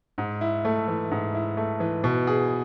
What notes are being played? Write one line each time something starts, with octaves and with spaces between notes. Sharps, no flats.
G#2
E4
A3
E3
G#2
E4
A3
E3
B2
G#4